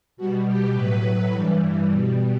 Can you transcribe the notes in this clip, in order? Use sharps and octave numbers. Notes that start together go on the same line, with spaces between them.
B2 G3 F#4
G4
A2 F#3 B4
G2 E3 G3
B2 G3